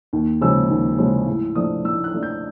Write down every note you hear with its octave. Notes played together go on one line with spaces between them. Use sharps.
D#2
C#3 F3 G#3 E6
D#2
C#3 F3 G#3
A2
F3 A3 D4 D#6
A2 E6
F#6
F3 A3 D4
G6